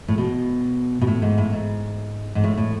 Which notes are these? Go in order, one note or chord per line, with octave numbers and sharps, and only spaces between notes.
A2
B2
B2
A2
G#2
A2
G#2
G#2
A2
A2